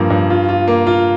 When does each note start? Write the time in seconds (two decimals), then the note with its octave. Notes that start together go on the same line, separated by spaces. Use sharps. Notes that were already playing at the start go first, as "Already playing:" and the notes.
Already playing: G2 F3 A#3
0.10 G2
0.30 F4
0.49 F4
0.68 A#3
0.87 F4